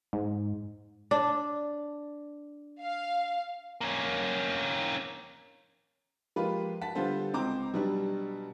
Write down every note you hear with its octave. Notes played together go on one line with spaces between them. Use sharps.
G#2
D4
F5
A#3 C#4
F3 G#3 A#3 F4 G4 B4
F#5 A5 B6
D3 G3 B3 F4 A4 C5
C#2 C4 C5 A#5 D6
B2 F#3 G3 D4